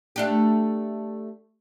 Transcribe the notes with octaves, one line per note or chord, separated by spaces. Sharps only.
A3 D4 G4